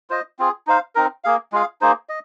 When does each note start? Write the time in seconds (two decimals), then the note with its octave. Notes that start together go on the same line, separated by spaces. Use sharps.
0.10 F4 C5 D#5
0.39 C4 F4 G#4
0.67 D#4 C5 F5
0.95 C4 D#4 A#4
1.24 A#3 G#4 F5
1.52 G#3 F4 G#4 F5
1.81 A#3 D#4 G#4 C5
2.09 D#5